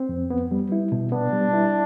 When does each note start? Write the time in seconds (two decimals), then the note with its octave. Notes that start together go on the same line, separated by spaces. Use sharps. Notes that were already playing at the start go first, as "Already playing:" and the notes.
Already playing: C4
0.09 F2
0.30 B3
0.51 G3
0.72 E4
0.92 B2
1.12 B3 D4
1.33 G3
1.54 E4